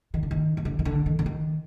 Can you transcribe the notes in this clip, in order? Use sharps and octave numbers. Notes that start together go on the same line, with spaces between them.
D#3
D3
D#3
D#3
D3
D#3
D3
D#3
D3
D#3